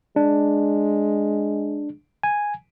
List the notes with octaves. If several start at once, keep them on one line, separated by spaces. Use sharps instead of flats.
G#3 D4
G#5